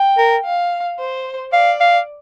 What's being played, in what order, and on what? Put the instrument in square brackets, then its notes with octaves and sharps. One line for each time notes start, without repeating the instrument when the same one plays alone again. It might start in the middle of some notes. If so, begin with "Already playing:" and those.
Already playing: [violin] G5
[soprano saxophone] A#4
[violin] F5
C5
[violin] D5 [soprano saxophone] F5
[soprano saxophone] F5